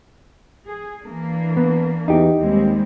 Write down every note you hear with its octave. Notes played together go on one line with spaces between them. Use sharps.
G#4
E3 A#3 D4
B3
E2 D#4 G4
D#2 G3 G#3 C4